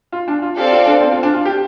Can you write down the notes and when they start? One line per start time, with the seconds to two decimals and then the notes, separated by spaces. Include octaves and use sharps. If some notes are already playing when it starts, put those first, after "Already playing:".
0.12 F4
0.28 D4
0.42 F4
0.56 C4 G4 A4 D5 F5
0.72 F4
0.86 D4
1.00 C4
1.12 F4
1.23 D4
1.33 F4
1.45 G4